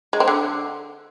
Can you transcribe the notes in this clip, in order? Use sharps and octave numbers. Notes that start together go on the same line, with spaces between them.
G#3
C4
D3